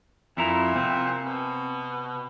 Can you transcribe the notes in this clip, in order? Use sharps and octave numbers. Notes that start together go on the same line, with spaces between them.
F2 A#2 E4 A#5
C3 C4
B2